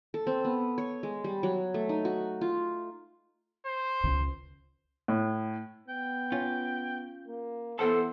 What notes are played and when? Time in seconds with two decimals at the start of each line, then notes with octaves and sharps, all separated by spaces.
0.14 A4
0.27 C4
0.44 B3
0.78 C#5
1.03 G#3
1.24 G3
1.43 F#3
1.74 A3
1.89 D#4
2.05 F#4
2.41 F4
3.66 C5
4.04 C#2 C#3
5.08 A2
5.89 B3 G5
6.32 C#4 F4
7.28 A#3
7.79 E3 B3 A4 C5 F#5 A5